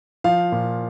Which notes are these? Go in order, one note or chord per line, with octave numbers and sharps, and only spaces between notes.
F3 F5
A#2